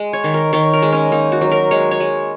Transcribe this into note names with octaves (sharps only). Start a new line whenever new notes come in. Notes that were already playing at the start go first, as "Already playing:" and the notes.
Already playing: G#3
C#5
D#3
A#4
D#3 C#5
A#4
G#3
C#4
A#3 D#4
F#4
F#3
A#4
G#3 C#5
C#5
G#3